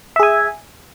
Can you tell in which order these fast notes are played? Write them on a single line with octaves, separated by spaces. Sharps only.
E5 G#4 G#5